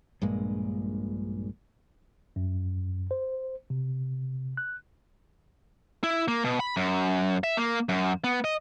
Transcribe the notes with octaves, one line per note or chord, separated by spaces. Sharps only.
A#1 G2 A#2 G#3
F#2
C5
C3
F#6
E4
A#3
B2
B5
F#2
E5
A#3
F#2
B3
D#5